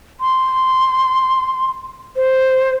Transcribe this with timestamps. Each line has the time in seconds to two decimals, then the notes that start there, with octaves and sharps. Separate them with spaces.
0.20 C6
2.16 C5